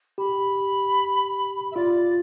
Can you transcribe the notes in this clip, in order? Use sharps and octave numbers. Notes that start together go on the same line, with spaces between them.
G4 B5
E5
F4 D5